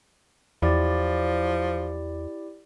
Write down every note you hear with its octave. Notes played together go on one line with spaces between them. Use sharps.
E2 F3 E4 G4 D5